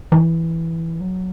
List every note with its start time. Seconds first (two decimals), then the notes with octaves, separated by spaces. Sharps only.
0.12 E3
1.00 F#3